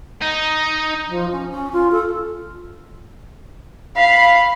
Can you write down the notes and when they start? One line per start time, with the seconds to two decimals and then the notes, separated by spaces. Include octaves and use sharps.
0.21 D#4
1.08 F3
1.31 C#4
1.50 C#4
1.73 F4
1.91 A4
3.97 F5 B5